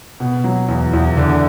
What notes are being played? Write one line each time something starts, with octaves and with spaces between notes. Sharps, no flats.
B2
F#3
E2
E2
D3